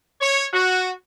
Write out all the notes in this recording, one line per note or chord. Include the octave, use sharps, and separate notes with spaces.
C#5
F#4